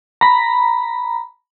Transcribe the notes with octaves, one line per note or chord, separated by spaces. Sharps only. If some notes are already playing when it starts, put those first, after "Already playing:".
A#5 B5